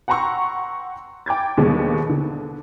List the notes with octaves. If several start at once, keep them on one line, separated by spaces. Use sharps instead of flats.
F#5 G5 A#5 C6 C#6 E6
G5 D6 G#6 A6
D#2 B2 D3 F3 G3 G#3
D3